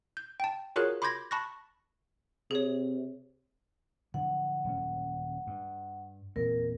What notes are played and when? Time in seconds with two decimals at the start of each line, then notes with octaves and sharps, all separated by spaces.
0.17 G6
0.40 G5 A5
0.76 F4 F#4 G#4 A#4 C#5 F#6
1.02 B5 C6 D6 G6 G#6 A#6
1.31 A5 B5 C#6 F#6 A#6
2.51 C3 G#4 C#5
4.14 D3 F3 F#3 F#5
4.64 D#1 F#3 C#4
5.47 G2
6.36 E2 A#2 C4 A#4